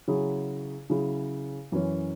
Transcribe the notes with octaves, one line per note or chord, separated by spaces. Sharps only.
C#3 F#3 E4 G#4
C#3 F#3 E4 G#4
F#2 E3 C#4